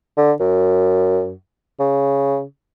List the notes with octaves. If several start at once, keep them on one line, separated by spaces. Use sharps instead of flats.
D3
F#2
C#3